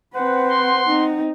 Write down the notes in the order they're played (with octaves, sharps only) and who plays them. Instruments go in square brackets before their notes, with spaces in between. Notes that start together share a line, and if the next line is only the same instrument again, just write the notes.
[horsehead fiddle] C4 B4 [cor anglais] C5 [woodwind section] F#5
[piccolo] C6
[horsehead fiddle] C4 D#4